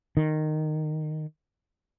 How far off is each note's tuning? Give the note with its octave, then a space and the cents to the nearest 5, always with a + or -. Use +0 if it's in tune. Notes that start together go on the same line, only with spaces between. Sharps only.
D#3 -15